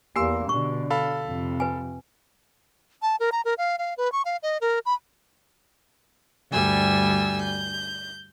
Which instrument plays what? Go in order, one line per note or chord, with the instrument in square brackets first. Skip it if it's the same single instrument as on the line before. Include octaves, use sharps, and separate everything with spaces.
[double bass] E2 A#3 [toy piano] G4 G#5 [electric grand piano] C6 E6 C7
[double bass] B2 D3 [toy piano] C#6
[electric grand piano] A4 F5 B5
[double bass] F2 C3
[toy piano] B4 G#5
[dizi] A5
A#4
A#5
A#4
F5
F5
B4
C#6
F5
D#5
A#4
B5
[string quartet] D2 G2 G3 G#5 E6
G6